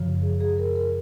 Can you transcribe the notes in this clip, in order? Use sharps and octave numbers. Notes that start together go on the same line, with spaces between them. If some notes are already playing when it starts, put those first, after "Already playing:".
Already playing: F#2 C#3 F3
G#4
G#4
A#4
A#4